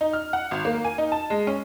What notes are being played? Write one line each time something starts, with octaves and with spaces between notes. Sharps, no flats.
D#4
F6
F#5
G#1
A#3
G#5
D#4
A5
G#3
C#4